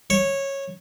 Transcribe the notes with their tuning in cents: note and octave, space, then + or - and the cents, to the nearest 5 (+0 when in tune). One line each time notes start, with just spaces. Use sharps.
C#5 -15